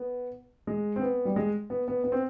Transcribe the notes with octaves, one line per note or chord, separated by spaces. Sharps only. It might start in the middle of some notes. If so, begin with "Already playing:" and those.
Already playing: B3
G#3
C4
B3
G3
G#3
B3
B3
B3
C4